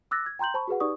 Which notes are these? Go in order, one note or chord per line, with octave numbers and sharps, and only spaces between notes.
D6 E6 F#6 A6 A#6
G#6
G5 A#5 C6 G6 F#7
C5 A5 B5 C#6
F#4 G#4 B4 F#5
D#4 G4 B4 D5 C#6 D#6